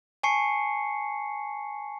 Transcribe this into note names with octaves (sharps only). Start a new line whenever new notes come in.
G#5 A5 C#6 C7 C#7